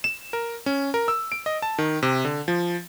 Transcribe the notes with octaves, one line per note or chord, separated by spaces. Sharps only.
E7
A#4
C#4
A#4
E6
D7
D#5
A5
D#3
C3
D3
F3